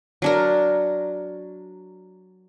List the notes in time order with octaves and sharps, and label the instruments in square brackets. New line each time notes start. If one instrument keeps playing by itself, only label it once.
[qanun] F#3 D4 A#4